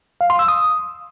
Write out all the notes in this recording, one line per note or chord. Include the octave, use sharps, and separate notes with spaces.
F5
C6
E6
D#6